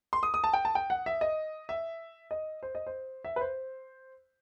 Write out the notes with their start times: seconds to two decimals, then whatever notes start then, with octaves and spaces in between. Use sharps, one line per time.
0.13 C6
0.23 D#6
0.34 D#6
0.44 A5
0.53 G5
0.65 A5
0.75 G5
0.90 F#5
1.06 E5
1.21 D#5
1.69 E5
2.31 D#5
2.63 C5
2.75 D#5
2.87 C5
3.24 E5
3.36 B4
3.41 C5